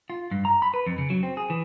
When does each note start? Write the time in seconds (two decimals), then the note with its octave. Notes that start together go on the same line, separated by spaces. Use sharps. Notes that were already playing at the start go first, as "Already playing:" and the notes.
0.10 F4
0.31 G2
0.45 A#5
0.62 B5
0.74 B4
0.87 F2
0.98 C#3
1.10 F#3
1.23 C4
1.37 G#4
1.50 E3